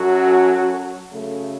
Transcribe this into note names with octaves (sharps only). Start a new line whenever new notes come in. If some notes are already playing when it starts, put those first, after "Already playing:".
Already playing: F#2 F#3 C#4 F#4 A4
F#2 C#3 A3